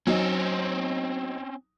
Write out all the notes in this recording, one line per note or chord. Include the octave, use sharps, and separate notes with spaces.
F#3 C4 C#4 D#4